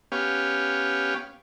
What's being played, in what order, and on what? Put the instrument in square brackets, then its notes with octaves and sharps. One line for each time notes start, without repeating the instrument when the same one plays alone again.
[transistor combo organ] B3 C#4 G4 F5